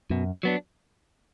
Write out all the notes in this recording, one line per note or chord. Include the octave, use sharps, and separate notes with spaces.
F#2 B2
F#3 B3 D4